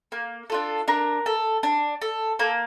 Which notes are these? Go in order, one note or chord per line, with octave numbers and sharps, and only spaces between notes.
A#3
D4 F4 A4
D4 A#4
A4
D4
A4
A#3 A4